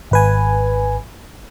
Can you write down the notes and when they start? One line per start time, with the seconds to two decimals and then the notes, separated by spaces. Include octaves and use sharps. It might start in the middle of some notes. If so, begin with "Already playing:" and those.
0.11 G#1 B4 G#5